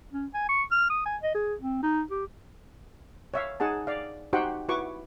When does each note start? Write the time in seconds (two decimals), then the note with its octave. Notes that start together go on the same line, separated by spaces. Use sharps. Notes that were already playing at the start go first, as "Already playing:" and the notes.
0.12 C#4
0.34 G#5
0.49 C#6
0.71 F6
0.90 D#6
1.06 G#5
1.22 D#5
1.34 G#4
1.61 C4
1.83 D#4
2.11 G4
3.34 C#5 E5 F5
3.60 D#4 G#4 F#5 A5
3.87 D5 F5
4.33 D#4 F#4 G4 C5 F#5 G5
4.68 E4 F#4 B4 C#6 D6